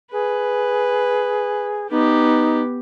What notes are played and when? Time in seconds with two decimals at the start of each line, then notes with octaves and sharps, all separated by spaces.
0.12 G#4 B4
1.91 B3 D#4 G4